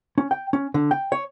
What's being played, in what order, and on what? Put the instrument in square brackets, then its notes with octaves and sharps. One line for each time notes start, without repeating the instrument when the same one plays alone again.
[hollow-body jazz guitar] C#4
G5
C#4
D3
G5
C#5